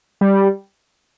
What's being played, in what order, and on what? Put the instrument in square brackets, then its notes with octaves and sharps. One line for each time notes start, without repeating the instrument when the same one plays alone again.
[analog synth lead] G3